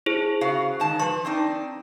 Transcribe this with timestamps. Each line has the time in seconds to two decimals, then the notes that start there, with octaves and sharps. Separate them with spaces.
0.06 E4 G#4 C5
0.41 C#3 F#4 F5
0.80 G#2 D#3 A5
1.00 F3 B4 C#6
1.25 C4 D4 D#4